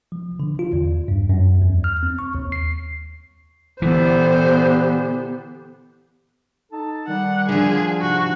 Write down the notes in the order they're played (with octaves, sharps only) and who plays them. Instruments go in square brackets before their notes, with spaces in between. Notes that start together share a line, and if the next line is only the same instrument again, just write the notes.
[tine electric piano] F3
D3
F4
E2
G2
F#2
E2
F6
C4
C#6
D#2
C7
[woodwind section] A#2 D3 [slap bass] E3 [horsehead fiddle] B3 G4 [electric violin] C5
[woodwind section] D#4 A4 A5
[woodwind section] D#3 G3 [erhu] F#5
[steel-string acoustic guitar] D3 F3 [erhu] G#4
[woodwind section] G#2 C3 [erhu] F#4